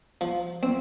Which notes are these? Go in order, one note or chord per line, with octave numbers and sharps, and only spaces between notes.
F3
C4